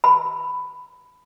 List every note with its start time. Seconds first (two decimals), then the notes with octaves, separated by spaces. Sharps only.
0.04 B5